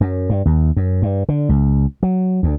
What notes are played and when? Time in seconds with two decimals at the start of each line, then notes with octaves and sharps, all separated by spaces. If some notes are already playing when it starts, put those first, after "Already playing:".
0.01 F#2
0.30 G2
0.46 D#2
0.77 F#2
1.02 G2
1.29 D3
1.49 C#2
2.03 F#3
2.43 D2